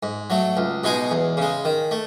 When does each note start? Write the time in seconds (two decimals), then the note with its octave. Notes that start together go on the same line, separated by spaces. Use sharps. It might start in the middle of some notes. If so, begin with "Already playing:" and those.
0.03 G#2
0.30 F#3 A3
0.57 C#2
0.84 B2 G#3 D#4 G#4
1.11 E2
1.37 C#3 G#3
1.65 D#3
1.91 A3